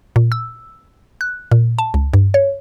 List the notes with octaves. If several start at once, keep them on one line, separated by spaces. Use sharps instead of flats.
A#2
E6
F#6
A#2
A5
C#2
G2
C#5